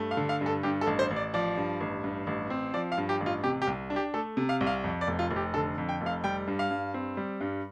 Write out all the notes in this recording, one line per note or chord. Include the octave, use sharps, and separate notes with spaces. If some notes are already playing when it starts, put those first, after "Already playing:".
Already playing: G2 A3
F5
D3
F5
G2
A4
G2 G4
A4
A1
C5
A1
D5
F3 D5
G2
A1
G2
A1
C4
F3 D5
F5
G2
G4
A1
F4
C3 G4
G4
C2
D4
G4
A3 A4
C3
F5
C2
F5
F2
D5
F1
F4
F1
G4
D3 A4
F2
G5
F1
F5
G3 G5
G2
F5
G2
C4
G3
G2